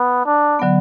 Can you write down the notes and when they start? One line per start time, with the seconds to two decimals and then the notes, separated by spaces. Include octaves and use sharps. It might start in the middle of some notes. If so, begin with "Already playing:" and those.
Already playing: B3
0.26 D4
0.59 D3 F#3 B3